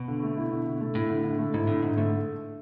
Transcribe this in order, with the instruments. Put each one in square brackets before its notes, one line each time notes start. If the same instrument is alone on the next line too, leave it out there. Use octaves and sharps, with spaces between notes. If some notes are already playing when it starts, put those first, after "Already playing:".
Already playing: [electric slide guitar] B2
[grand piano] D3
A3
E4
D3
D3
A3
[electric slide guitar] A2 [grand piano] E4
[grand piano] D3
D3
A3
[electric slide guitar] G#2 [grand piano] E4
[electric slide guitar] A2 [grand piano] D3
[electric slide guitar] G#2 [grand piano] D3
[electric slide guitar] G#2 [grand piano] A3